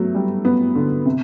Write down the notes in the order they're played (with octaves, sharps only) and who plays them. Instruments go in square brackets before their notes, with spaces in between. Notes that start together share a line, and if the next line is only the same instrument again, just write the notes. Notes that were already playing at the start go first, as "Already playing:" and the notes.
Already playing: [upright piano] F#3 A3 B3
G3
B3
D3
C3